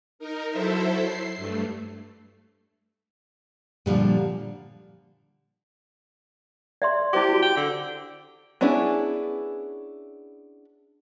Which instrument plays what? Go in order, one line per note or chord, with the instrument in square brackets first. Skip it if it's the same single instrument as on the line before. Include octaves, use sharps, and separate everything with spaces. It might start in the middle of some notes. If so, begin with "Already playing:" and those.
[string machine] D#4 A#4
F#3 E4 A4 C5 E5
C7
G2 A3
[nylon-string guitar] A#2 D3 F3 [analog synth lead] G3
[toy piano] D5 E5 C6
[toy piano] E4 C5 D6 [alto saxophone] G4
[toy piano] E4 F#4
[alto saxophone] G5
D3
[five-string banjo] B3 C#4 D4 E4 G#4